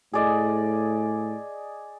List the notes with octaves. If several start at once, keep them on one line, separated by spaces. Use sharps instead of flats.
A2 G#4 D5 D#5